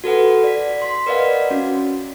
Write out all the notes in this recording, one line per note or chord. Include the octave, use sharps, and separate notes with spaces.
F#4 A4 B4 F#5
D5 B6
C6 B6
A#4 B4 D5 D#5 F5 F#5
C#4 F#4